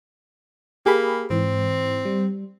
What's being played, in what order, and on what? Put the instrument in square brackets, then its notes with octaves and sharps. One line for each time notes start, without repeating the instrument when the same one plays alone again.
[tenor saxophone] A#3 [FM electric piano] G4 G#4 B5
[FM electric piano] G#2 E3 [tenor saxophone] C4
[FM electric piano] G3